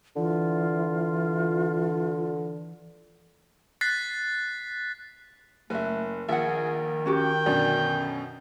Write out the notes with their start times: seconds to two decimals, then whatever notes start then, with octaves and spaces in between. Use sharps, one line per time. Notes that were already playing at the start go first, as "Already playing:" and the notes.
0.16 D3 E3 F4
3.81 F#6 A6 B6 C7
5.70 F#1 A3 B4 E5
6.29 A#1 D#3 G#4 E5 F#5
7.06 C#4 F#4 G4 G5
7.46 F#2 B2 D3 D5